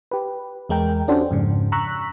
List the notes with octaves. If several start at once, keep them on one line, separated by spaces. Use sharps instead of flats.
G4 B4
E2 G#3 A#4 G5
C#4 D4 F#4 G4 A4 C5
F2 G#2 C#3
A#5 C#6 E6 F#6 B6